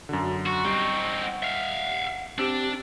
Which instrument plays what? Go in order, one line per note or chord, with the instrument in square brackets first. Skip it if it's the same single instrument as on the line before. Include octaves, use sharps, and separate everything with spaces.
[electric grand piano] F#2 D3 [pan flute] F#4
[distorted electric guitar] F#4 [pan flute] C#6
[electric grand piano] G3 [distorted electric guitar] C4 D#4
[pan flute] F#5
[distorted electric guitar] E5 F5
[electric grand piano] C4 E6 [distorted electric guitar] D4 [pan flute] G4